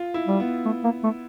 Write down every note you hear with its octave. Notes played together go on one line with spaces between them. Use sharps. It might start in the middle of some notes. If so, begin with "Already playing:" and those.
Already playing: F4
E4
G3
B3
A3
A#3
A3